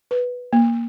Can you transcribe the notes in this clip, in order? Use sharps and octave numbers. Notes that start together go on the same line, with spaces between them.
B4
A#3